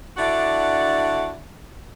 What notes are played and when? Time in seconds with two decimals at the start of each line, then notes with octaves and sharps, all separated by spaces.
0.17 D3 D4 E4 F#4 D5 F#5